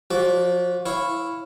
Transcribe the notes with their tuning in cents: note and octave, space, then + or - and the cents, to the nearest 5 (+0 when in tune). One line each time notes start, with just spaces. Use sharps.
F3 +30 F#4 +0 D5 -20
E4 +0 C#5 -10 F5 +0